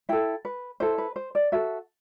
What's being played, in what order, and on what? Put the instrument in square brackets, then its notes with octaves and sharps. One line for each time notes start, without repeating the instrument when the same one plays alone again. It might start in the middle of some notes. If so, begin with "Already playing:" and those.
[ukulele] E4 A4 G5
B4
E4 A4 C5
B4
C5
D5
F#4 A4 E5